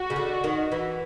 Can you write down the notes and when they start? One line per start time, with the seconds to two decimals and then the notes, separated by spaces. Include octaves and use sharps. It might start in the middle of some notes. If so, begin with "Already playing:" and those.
Already playing: F#4
0.10 C#3
0.16 D3
0.44 D#3
0.72 E3